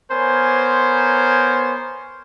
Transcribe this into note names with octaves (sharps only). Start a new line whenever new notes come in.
B3 A#4 C5 C#5 G#5